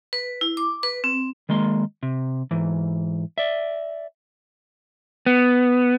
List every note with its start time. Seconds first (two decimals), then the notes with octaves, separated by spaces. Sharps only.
0.13 B4
0.41 E4
0.57 D6
0.83 B4
1.04 C4
1.49 D#3 G#3 A#3 C6
2.03 C3
2.51 G#2 E3
3.38 D5 E5
5.26 B3